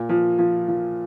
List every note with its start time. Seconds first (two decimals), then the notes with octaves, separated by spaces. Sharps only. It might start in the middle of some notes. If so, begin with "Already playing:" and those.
Already playing: A#2
0.09 F3
0.39 F3
0.68 F3